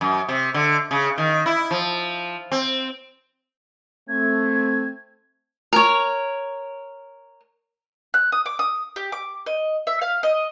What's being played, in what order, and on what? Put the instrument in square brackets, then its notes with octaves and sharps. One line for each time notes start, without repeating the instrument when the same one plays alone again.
[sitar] F#2
C3
D3
C#3
D#3
E4
F3
C4
[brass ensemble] A3 C4 [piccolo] G#6
[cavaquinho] A#4 C#5
[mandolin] F#6
D#6
D6
D#6
G4
D6
D#5
E5
F5
D#5